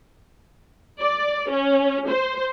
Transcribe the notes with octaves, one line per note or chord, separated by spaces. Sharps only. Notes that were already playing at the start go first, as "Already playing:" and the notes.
D5
C#4
C5